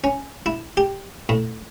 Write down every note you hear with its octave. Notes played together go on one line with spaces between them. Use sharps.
C#4
E4
G4
A2